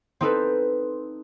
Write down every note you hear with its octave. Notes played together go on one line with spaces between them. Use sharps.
C4 D#4 A4 B4